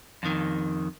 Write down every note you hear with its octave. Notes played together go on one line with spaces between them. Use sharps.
F2 D#3